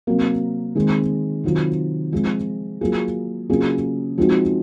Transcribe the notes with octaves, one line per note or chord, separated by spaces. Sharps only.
C3 F#3 A#3
D#3 G#3 C4
C3 D#3 F#3 C4 F4
F3 G#3 C4 F4
F#3 A#3 F4 G#4
C#3 F#3 A#3 F4 G#4
F3 G#3 C4 D#4 F#4